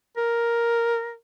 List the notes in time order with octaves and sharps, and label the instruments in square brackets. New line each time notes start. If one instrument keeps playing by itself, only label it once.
[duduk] A#4